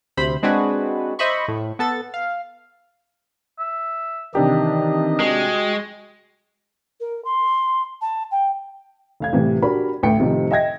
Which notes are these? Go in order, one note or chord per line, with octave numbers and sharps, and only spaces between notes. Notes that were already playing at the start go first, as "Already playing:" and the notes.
D2 C3 C5 B5
G#3 C4 D4 F#4 G#4 B4
C5 D#5 E5 B5 C#6
A2
B3 A4 A6
F5
E5
C3 D#3 E3 D4 D#4 G4 D#5
G#3 F#4 G5
A#4
C6
A5
G5
F1 F5 G#6
A2 C3 E3 G3
D4 F#4 G4 A#4 B5
A1 D2 B4 G5 C#7
A2 C3 D#3 F3 A3 G4
D#5 E5 G5 G#6 A#6